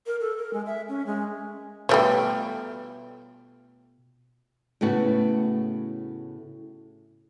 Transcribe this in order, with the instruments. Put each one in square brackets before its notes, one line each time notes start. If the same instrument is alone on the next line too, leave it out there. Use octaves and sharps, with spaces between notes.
[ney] A#4
A4
A#4
G#3
E5
C#4
G#3
[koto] B2 F4 G5 [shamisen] G3 A3 C#5
[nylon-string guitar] A2 C#3 A3 B3 F#4